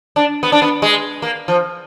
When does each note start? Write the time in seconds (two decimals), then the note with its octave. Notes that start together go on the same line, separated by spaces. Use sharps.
0.16 D4
0.43 B3
0.52 D4
0.62 B3
0.82 G#3
1.22 A#3
1.48 F3